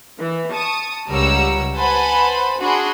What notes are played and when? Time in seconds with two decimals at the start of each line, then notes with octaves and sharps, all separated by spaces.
0.18 E3
0.51 A5 C#6 D#6
1.10 C#2 G3 A#4 C#5 F#5 E6
1.75 B4 C5 F#5 G#5 A5 B5
2.60 D4 F#4 G#4 B5 C6